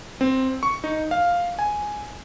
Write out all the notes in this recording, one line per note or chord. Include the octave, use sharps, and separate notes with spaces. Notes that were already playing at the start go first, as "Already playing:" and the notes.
C4
C#6
D#4
F5
G#5